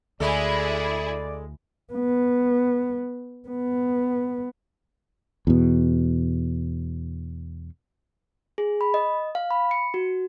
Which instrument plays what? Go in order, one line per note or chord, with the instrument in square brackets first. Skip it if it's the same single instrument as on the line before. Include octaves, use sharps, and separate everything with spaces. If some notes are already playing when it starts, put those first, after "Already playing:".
[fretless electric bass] D2 [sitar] G#3 A4 [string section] E4 G#4 [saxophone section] D5
[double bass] B3
B3
[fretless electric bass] E2 B2
[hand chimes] G#4
B5
D#5
F5
B5
C#7
F#4